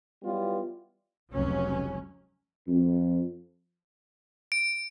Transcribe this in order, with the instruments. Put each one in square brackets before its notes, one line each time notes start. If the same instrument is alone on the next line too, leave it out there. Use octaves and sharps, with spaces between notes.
[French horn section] E3 F#3 G3 B3 F4
[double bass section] F1 C#2 F#3 C#4
[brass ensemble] F2
[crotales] D7